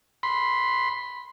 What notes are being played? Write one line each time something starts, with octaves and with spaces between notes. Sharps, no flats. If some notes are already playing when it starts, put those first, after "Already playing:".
B5 C6